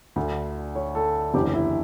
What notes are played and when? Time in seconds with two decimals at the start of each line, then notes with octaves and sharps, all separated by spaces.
0.16 D2 D3
0.75 C#5
0.95 A4
1.34 F#1 E2 D3 G4
1.54 E4